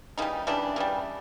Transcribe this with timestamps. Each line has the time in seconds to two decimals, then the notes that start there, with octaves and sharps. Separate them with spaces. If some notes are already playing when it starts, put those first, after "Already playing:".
0.18 C#3 E3 G3 D#4
0.47 C#3 E3 G3 D4
0.76 C#3 E3 G3